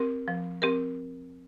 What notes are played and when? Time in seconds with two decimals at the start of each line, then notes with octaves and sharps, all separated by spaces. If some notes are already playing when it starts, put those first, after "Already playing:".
Already playing: C4 G4 A#4
0.28 F3
0.62 C4 G4 A#4